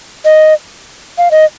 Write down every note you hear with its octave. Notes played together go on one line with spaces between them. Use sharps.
D#5
F5
D#5